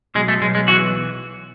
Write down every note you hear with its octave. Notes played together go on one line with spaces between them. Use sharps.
B1 G#3
A3
B1 G#3
G#3
E3 F#4